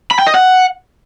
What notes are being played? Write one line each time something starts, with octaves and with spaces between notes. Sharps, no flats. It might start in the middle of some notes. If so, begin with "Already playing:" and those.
B5
G5
D#5
F#5